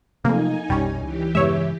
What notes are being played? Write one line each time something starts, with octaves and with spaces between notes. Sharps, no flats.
F2 C3 F#3 A3 A#3 D#4 G#5
A#1 F2 B2 G3 C#4
C#2 E3 G4
E2 G2 C#3 G#3 C#5 E5